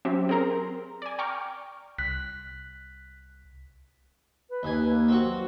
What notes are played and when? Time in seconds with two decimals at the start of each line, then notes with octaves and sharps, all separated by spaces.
0.05 F#3 C4 C#4 G4 E5
0.29 C4 G#4 A#4 A#5 C6
1.02 D5 G#5
1.19 G5 A#5 C#6 D6 F6
1.98 C2 F#6 B6
4.50 B4
4.63 D#2 G#5
4.90 A#3
5.08 C4 F#4
5.23 F#3